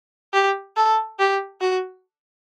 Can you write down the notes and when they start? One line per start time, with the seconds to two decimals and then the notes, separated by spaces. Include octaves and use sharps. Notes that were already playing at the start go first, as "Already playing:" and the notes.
0.33 G4
0.77 A4
1.19 G4
1.61 F#4